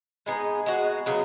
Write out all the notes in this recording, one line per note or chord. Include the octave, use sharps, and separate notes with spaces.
G#3 B3 D#4 G#4
G#3 B3 F#4
C#3 F#3 B3